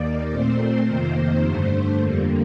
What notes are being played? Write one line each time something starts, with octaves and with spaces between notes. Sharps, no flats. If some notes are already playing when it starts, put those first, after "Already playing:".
Already playing: D#2 D#3 A#3 D5
A#2 A3 C4 C5
F2 C3 D#3 A#3
G2 D3 A3
F2 D3 G3 A#3